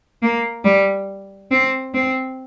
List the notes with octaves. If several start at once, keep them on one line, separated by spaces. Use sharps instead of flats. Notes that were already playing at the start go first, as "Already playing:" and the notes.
A#3
G3
C4
C4